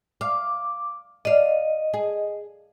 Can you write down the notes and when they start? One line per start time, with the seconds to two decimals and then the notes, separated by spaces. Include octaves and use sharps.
0.21 F5 D6
1.25 D5 D#5 F5
1.94 G#4